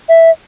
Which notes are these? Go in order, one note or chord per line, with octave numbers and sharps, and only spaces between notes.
E5